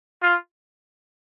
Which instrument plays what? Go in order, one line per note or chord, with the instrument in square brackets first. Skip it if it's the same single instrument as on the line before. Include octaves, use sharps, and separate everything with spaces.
[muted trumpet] F4